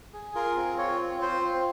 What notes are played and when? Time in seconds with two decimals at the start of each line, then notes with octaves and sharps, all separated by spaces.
0.13 G#4
0.35 F4 A#4
0.56 C4
0.78 F4 C#5
1.01 C4
1.21 F4 C5
1.44 C4